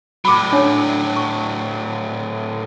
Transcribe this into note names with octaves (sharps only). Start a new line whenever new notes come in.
A2 F#3 B5 D6
D4 C#5 A5
C#6